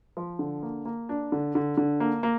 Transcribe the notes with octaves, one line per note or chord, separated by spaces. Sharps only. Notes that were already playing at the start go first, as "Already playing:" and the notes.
F3
D3
A#3
A#3
D4
D3
D3
D3
A#3
A#3